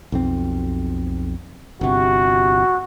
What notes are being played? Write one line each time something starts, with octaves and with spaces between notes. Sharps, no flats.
B1 F2 C4
G1 C3 F#4